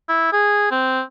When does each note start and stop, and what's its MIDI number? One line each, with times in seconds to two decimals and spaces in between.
0.09 0.30 64
0.33 0.70 68
0.71 1.01 60